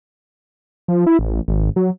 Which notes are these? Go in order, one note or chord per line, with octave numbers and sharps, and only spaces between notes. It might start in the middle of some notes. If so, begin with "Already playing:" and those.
F3
E4
A1
G#1
F#3